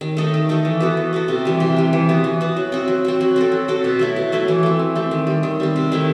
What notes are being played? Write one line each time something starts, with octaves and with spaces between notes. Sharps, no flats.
D#3
A3 D#4 A4
D#3
A3 D#4 A4
E3
B3 F#4 A4
E3
B3 F#4 A4
C3
E3 G3
C3
E3 G3
E3
B3 F#4
E3
B3 F#4
F#3
C4 F#4
F#3
C4 F#4
F#3
C4 F#4 A4
F#3
C4 F#4 A4
B2
F#3 A3 E4
B2
F#3 A3 E4
E3
A3 C4
E3
A3 C4
D#3
G3 C4
D#3
G3 C4
C3
D#3 A3 E4